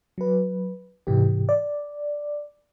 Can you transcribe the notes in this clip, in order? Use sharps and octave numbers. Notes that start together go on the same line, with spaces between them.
F#3 B4
G#2 C3 E3 G4
D5